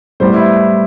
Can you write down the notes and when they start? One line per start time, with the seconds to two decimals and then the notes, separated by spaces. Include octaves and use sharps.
0.20 A2 G3 B3 C5
0.34 E4